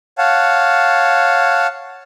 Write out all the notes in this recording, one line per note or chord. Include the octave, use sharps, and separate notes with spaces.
C#5 F5 F#5 A5